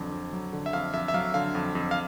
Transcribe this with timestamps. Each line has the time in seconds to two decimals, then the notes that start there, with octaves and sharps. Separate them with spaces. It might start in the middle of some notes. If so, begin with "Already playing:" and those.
Already playing: F2 D3 F#3
0.12 F2
0.33 F#3
0.53 D3
0.66 E5
0.73 F2 F5
0.94 F2 E5
1.08 E5
1.14 F#3 F5
1.34 D3 F5
1.55 F2
1.75 F2
1.91 F5